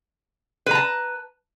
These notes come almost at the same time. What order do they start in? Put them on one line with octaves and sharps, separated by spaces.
B4 A#5 A5